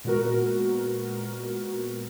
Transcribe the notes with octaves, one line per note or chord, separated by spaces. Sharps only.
A#2 G#3 B3 F#4 A#4